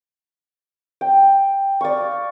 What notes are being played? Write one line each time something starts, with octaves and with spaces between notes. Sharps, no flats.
G5
D5 F5 C#6